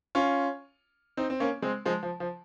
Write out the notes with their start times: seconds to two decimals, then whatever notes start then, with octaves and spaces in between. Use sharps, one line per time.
0.15 C#4 F4
1.17 C4 D#4
1.30 C4
1.40 A#3 C#4
1.62 G#3 C4
1.85 F3 G#3
2.03 F3
2.20 F3